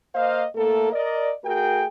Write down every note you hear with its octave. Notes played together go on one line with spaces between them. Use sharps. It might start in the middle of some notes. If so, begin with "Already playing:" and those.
A#3 C5 D#5 F5
A2 A3 A#3 A4
A#4 D5 D#5
A3 F#4 G#4 A#4 G5